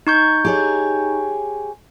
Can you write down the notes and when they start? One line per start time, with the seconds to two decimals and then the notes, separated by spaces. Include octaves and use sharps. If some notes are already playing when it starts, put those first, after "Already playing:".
0.07 D#4 C#6 G6
0.45 G4 G#4 C#5